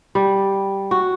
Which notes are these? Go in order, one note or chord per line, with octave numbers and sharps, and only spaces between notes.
G3
F#4